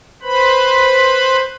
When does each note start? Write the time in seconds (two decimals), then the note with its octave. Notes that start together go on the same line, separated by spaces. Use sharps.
0.22 B4 C5 B5